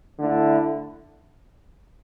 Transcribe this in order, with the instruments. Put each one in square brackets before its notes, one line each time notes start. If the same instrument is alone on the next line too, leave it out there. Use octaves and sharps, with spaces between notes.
[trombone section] D3 A3 E4